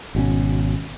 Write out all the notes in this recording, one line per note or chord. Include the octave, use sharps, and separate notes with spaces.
G#1 B2 C4 C#4